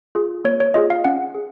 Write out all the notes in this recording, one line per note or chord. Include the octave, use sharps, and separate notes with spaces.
F4 G#4
A#3 C#5
C#5
F4 G#4 D#5
F5
C#4 F#5
G#4